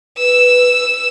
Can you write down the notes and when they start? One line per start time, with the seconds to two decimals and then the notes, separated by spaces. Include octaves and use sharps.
0.18 B4 E6